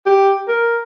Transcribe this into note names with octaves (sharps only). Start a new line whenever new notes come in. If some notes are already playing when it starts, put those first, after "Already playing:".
G4
A#4